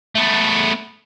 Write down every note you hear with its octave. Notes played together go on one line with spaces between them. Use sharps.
A3 B3